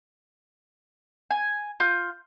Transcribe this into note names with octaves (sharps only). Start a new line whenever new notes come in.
G#5
F4 G6